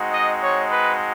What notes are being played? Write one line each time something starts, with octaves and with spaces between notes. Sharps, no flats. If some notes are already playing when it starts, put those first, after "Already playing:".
Already playing: G#3 C4 D#4 F#4
D#5
C#5
B4